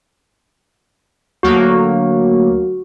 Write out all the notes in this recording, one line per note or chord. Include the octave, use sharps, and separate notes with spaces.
D2 F#3 A#3 F#4